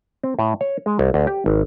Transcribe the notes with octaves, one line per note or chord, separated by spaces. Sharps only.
C4
A2
C#5
G#3
C2
D2
G4
G#1